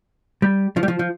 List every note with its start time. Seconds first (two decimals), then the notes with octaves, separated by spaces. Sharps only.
0.42 G3
0.77 F3
0.83 G3
0.88 F3
0.99 F3